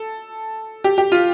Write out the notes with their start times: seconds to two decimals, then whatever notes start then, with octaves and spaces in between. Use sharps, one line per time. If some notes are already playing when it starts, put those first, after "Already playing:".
Already playing: A4
0.84 G4
0.98 G4
1.12 F4